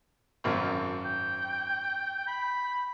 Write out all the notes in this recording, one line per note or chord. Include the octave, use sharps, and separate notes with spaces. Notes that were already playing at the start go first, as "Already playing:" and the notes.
G#1 F#2
G5
B5